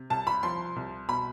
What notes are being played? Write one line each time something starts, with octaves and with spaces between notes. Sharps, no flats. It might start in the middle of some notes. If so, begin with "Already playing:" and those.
Already playing: C3
C2 A5
B5
F3 C6
C2
B2 B5